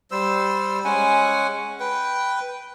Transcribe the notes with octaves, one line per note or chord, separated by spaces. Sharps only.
G3 C5 E6
G#3 C#4 F#5 G#5
B4 G5